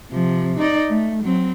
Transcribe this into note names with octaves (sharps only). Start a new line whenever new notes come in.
C3 F3
D#4 D5
A3
F#3 C4